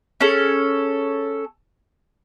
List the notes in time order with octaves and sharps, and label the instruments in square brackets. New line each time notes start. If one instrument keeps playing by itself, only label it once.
[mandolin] C#4 G#4 A4